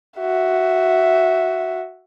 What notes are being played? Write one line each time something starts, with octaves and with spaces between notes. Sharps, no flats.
F#4 E5